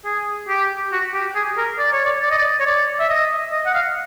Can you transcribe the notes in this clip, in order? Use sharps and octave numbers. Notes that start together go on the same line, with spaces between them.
G#4
G4
F#4
G4
G#4
A#4
D5
C#5
D5
D5
D#5
D5
C#5
D5
E5
D#5
D#5
F#5
F5